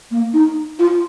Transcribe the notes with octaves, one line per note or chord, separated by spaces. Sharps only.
A#3
D#4
F4